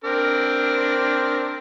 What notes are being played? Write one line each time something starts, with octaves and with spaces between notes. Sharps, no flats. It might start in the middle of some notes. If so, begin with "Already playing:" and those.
C4 D4 A#4